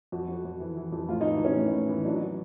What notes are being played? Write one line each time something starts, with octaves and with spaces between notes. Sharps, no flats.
F2 F#4
F2
F2
E3
E3
F2
A2 F4
D#4
E3
E3 C#4
A2
A2
E3
F#3 D4
F#3